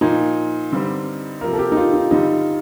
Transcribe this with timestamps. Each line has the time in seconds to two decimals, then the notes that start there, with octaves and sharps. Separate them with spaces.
0.01 A#2 F3 A#3 D#4
0.72 G2 D3 G3 C4
1.41 C3 F3 A#3 A#4
1.53 A4
1.59 G4
1.72 D#4
1.77 F4
1.94 D#4
2.11 G2 D3 G3 D#4